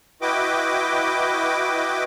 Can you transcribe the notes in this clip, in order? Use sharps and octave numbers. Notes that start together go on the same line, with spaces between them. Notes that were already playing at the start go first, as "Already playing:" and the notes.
E4 F#4 B4 D#5 G5 D6